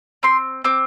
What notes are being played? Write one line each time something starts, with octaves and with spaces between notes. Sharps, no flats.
C4 C6
C4 D6